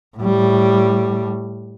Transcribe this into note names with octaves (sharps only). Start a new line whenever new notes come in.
A2 G3